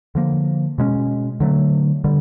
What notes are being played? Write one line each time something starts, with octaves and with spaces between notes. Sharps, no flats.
D3 F3 A#3
B2 G#3 C#4
D3 F#3 A3
D3 G3